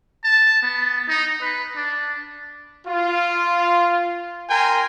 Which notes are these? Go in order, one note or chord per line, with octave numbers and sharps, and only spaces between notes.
A5
B3
D#4
B4
D4
F4
A#4 G5 G#5 A#5 C6